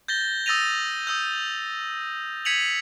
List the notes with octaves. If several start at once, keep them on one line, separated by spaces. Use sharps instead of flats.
G6 A6 A#6 G7
D#6 E6 A6 A#6 D#7 F7
D#6 E6 G6
G#6 B6 C#7 D#7 F7 F#7